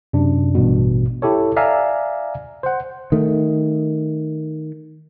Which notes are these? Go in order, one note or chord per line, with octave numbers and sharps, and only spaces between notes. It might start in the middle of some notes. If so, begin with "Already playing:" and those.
F#2 C3 D4
A1 G2 B2
E4 G4 A4 C#5
D5 E5 F5 G#5 A#5
C5 F#5
D#3 A3